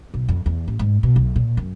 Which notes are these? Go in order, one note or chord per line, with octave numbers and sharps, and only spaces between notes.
B1
F2
E2
A1
G#2
B2
B1
A#2
F#2